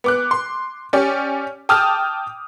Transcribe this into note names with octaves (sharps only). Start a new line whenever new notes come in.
B3 D6 F#6
C6
C#4 G4 D5
G5 A5 D6 D#6 F6 G6